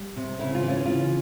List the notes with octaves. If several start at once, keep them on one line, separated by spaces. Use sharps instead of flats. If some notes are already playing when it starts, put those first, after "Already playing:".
Already playing: G3
C3
C#3 E4
F4
E3
C#4
C#3 F4